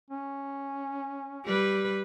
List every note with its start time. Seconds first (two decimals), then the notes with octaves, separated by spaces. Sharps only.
0.10 C#4
1.45 G3 B4